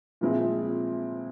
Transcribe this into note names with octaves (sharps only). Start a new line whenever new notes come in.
A#2 F3 G#3 C4 E4